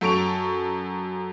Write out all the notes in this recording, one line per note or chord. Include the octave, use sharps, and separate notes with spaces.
F#2 A4 C#6 D7 F7